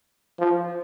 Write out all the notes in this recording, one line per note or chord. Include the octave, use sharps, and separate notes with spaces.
F3